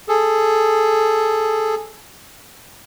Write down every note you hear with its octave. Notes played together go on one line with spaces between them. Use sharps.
G#4 A4